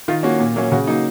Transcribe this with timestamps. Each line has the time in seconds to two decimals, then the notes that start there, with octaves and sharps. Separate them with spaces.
0.08 D#3 F4
0.23 A#3 C#4 F#4
0.40 A#2
0.56 F#3 A#3 C#4
0.72 C#3 F#4
0.87 F#3 A#3 D#4